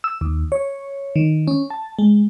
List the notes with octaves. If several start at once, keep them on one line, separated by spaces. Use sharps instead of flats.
E6
D#2
C#5
D#3
C#4
A5
G#3